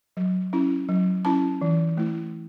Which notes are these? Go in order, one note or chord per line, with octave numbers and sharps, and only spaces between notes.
F#3
C#4 E4
F#3
C#4 E4 A5
E3
A3 E4